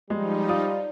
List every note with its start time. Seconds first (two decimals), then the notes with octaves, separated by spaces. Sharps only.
0.10 F3 G3 G#3 D#4
0.49 F4 D5 D#6